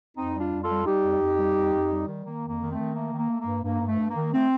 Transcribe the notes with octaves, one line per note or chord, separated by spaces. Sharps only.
F2 C4 D#4
G3
D4 F4
F2
F4 A4
G3
G3 D#4 G4
F2
F2
G3
F2
F2
G3
D#3
D#3 A#3
F2
A#3
D#3
A3 C4
D#3
A3 A#3
D#3
A#3
A3
A#3
G2
G2 A#3
G2
A3
G2
A#3
D#3
A3 C4